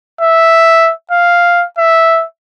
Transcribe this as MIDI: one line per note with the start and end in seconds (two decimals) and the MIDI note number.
0.21 0.92 76
1.11 1.65 77
1.78 2.24 76